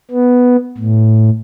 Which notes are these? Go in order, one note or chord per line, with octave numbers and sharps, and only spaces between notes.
B3
A2